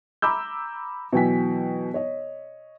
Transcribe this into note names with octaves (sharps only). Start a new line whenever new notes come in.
A#5 B5 D6 E6 G6
B2 E3 F#3 G5 G#5 B6
C#5 D#5